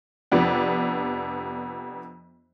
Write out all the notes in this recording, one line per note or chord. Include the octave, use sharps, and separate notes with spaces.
F2 C3 B3 D4